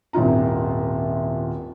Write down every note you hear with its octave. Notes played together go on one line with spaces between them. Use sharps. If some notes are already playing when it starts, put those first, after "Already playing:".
D#1 G#1 E4 F4 A#5